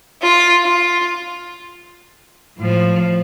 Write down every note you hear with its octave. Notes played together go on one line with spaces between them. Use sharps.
F4
F4
A2 F3